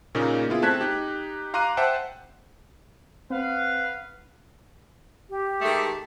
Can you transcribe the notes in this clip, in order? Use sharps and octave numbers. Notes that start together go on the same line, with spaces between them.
A#2 C#3 A#3 C#4 D#4 G#4
B3 E4 F4 G#4
A3 C4 A5 F#6 G#6 B6
D#4 G4
F5 A#5 C6 D6 F#6 D#7
C5 E5 F#5 G5 A5
C4 B4 F5 F#5
G4
D#3 G#3 A3